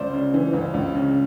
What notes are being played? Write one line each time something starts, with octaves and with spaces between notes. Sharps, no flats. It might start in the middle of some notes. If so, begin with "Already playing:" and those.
Already playing: C#2 C5 D5
C#3
E3
C#2
C#2
C#3